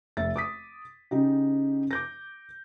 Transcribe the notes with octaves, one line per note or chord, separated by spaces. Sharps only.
F1 E5 A6
D6 D#6 B6
C#3 D#4 G4
D6 G6 A#6